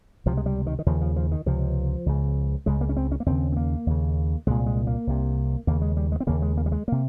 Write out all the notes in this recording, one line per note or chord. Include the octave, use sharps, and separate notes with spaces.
C#2 C3 F3
G#3
G3
D#3
D#3
D#2 C#3 F3
F3
F3
D#3
C#2 C3 F3
C#2 C#3
C#2 C#3 G#3
A#3
C#4
C4
C#4
A#3
D#2 C#3 C4
C4
A#3
D#2 C#3
C2 A#2 G#3
G#3
A#3
C2 C3
D#2 C#3 A#3
G#3
G3
G#3
C4
D#2 C#3 A#3
G#3
A#3
G3
G#3
C3 A#3